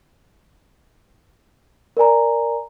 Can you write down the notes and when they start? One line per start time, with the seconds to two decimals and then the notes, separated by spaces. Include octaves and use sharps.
1.97 A#4 D5 G#5 A#5